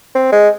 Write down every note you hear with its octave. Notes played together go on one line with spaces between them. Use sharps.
C4
G#3